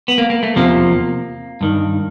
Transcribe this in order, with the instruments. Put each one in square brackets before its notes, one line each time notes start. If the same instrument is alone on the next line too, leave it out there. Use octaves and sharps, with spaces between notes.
[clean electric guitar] B3
A#3
A#3
A3
E2 C3 F3 A#3
G2 D#3